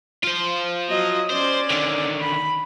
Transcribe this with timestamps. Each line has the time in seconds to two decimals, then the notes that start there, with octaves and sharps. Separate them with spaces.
0.24 F4 C5
0.89 F#3 D#5
1.30 C#4 C5 D5
1.70 D3 D#3
2.21 B5